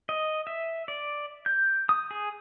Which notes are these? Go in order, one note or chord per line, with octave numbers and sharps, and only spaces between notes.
D#5
E5
D5
G6
D#6
G#4